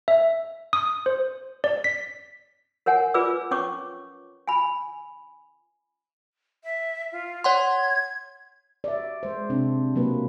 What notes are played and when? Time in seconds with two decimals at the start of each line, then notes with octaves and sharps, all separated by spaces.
0.08 E5
0.73 D#6
1.06 C5
1.64 D5
1.84 B6
2.86 A#4 C#5 F#5 G#5
3.14 F4 G#4 B4 D5 D6 E6
3.51 C#4 C#5 C#6 D6
4.48 G#5 B5
6.64 E5
7.12 F4
7.44 C#5 F#5 C6 G#6
8.84 D5 E5
9.23 G#3 C5
9.50 C3 C4 D4
9.95 B2 F#3 A#3 B4